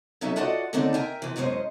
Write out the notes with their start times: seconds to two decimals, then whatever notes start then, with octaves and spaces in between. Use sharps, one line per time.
0.21 F#3 C#4 D#4 A4 E5
0.36 F4 F#4 A4 D5 D#5 F#5
0.73 D#2 D3 A3 C4 D4 D#4
0.94 A#4 E5 G5 G#5
1.22 E3 F3
1.36 F#2 A2 G#3 C#4 C5 D#5